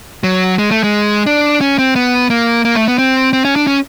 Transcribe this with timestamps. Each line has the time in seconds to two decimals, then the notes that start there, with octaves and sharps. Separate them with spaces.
0.23 F#3
0.58 G#3
0.71 A3
0.84 G#3
1.26 D4
1.61 C#4
1.78 C4
1.96 B3
2.30 A#3
2.65 A#3
2.75 A3
2.88 B3
2.98 C4
3.33 C4
3.45 C#4
3.56 D4
3.67 C#4